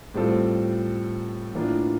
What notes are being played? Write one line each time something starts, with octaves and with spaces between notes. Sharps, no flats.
A2 G3 C4 F4 A4
A2 E3 A#3 D4 F4